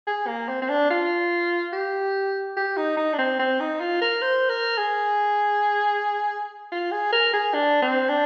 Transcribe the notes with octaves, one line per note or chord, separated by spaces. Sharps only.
G#4
A#3
C4
C4
D4
F4
G4
G4
D#4
D#4
D4
C4
C4
D#4
F4
A#4
C5
A#4
G#4
F4
G#4
A#4
G#4
D4
C4
D4